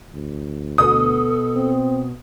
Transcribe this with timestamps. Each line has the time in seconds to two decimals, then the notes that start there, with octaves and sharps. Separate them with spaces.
0.15 D2
0.78 B2 A4 D#6
1.56 C4